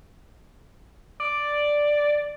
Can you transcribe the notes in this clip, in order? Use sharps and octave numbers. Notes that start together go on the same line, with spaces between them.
D5